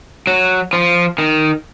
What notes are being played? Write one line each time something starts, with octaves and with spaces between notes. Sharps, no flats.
F#3
F3
D#3